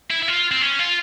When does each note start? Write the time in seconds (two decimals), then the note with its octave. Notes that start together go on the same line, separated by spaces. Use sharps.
0.10 E4
0.22 E4
0.28 F4
0.51 C4
0.61 C#4
0.79 F4